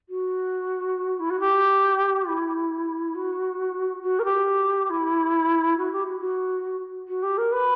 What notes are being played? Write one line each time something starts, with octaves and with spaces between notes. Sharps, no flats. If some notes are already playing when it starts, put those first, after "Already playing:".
F#4
E4
F#4
G4
E4
F#4
F#4
A#4
G4
E4
F#4
G4
F#4
F#4
F#4
G4
A#4
B4